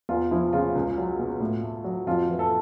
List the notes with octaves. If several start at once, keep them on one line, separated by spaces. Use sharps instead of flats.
E2 F4
F3 E4
C#3 F4
C#2
F#3
B2
A2
A3
F#3
F2 F4
E3
A4